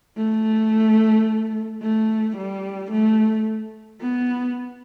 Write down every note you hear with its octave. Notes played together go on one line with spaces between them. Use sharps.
A3
A3
G3
A3
B3